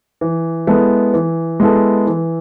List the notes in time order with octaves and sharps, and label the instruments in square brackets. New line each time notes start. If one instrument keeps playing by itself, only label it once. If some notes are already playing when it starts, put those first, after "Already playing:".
[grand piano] E3
G#3 B3 E4 A4
E3
G#3 B3 E4 A4
E3